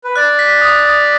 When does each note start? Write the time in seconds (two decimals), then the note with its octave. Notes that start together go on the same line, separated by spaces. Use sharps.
0.04 B4
0.16 D5 F#6
0.39 B6
0.62 D#6
0.85 D#6